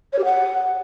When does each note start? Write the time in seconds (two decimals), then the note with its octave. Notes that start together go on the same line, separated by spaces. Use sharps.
0.13 C#5
0.19 G4
0.24 F#5